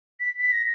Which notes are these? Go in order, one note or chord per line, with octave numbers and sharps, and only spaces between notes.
B6
B6
A#6